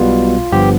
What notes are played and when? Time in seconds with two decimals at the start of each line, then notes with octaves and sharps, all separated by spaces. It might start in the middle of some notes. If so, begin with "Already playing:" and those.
Already playing: B1 B2 G3 B3 F4
0.52 G1 G2 F3 B3 G4